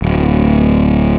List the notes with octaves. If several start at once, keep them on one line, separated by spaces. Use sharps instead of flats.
D1